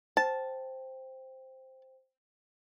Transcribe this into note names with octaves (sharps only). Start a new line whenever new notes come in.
C5 G5 A5